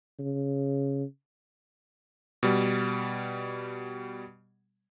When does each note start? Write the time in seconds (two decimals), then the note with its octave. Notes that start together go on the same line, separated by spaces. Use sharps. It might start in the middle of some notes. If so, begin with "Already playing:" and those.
0.19 C#3
2.43 B2 G3